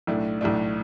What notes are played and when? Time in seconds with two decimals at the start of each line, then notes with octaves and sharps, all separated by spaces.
0.07 B1 A2 A3 D4
0.41 B1 A2 A3 D4